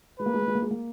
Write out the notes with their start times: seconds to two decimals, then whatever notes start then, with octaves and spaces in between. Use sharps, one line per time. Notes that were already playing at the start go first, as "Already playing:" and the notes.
0.19 G#3 B4
0.26 A#3
0.34 G#3
0.41 A#3
0.48 G#3
0.55 A#3
0.62 G#3
0.71 A#3